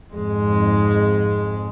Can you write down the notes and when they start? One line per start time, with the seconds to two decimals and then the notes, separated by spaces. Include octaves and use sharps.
0.14 F2 G#2 G#3